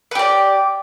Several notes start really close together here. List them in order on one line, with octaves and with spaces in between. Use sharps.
B4 G4 D5